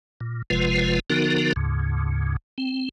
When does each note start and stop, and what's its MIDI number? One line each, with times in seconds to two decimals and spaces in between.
0.21 0.42 46
0.50 1.00 30
0.50 1.00 48
0.50 1.00 53
0.50 1.00 56
0.50 1.00 65
0.50 1.00 71
1.10 1.53 50
1.10 1.53 53
1.10 1.53 59
1.10 1.53 63
1.10 1.53 66
1.10 1.53 70
1.56 2.36 38
1.56 2.36 44
1.56 2.36 49
2.58 2.89 60